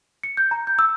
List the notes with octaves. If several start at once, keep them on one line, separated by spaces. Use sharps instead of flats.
C#7
G6
A#5
G6
E6